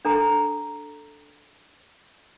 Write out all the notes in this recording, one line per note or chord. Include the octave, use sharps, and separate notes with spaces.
D4 A4 A#5